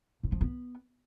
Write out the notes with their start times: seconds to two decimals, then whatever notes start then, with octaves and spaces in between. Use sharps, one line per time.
0.23 G#2
0.32 F3
0.41 B3